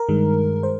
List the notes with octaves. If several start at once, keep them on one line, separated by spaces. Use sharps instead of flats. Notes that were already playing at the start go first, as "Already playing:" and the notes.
Already playing: A#4
G2 D#3 G#3
C5